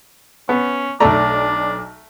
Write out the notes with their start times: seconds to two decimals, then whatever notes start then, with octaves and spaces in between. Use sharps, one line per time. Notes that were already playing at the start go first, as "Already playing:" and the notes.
0.49 B3 C#4
1.00 B1 A3 D4 D5 A#5